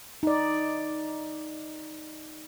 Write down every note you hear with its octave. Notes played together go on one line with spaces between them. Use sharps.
D#4 D5